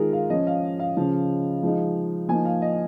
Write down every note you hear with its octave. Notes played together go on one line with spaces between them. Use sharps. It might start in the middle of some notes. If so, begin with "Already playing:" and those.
Already playing: D#3 G#3 D#4 F4 G#4 A#4
F5
F3 C#4 D#5
F5
F5
C#3 F3 C#4
F3 G#3 D#4
F3 A#3 D#4 G#5
F5
D#5